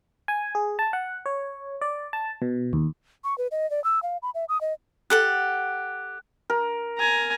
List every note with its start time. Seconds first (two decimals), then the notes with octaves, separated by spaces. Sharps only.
0.28 G#5
0.55 G#4
0.79 A5
0.93 F#5
1.26 C#5
1.82 D5
2.13 A5
2.42 B2
2.73 D#2
3.24 C#6
3.38 B4
3.51 D#5
3.71 D5
3.84 E6
4.03 F5
4.22 B5
4.35 E5
4.49 D#6
4.61 D#5
5.10 G4 A4 F#5 F#6
6.50 A#4
6.99 G#5 A#5